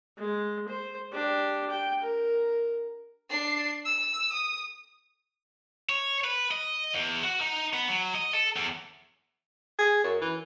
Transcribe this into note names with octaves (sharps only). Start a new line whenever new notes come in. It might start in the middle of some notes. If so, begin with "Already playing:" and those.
G#3
C5
D4 G4
G5
A#4
D4 C7
E6
D#6
C#5
B4
D#5
E2
F#4
D#4
B3
F#3
D#5
A4
E2
G#4
F#2
E3